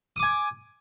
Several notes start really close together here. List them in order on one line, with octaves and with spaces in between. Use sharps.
D#6 D6 G#5